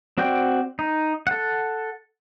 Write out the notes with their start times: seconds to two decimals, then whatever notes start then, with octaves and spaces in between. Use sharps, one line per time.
0.18 C4 F#4 D5 G5
0.79 D#4
1.27 A4 F#5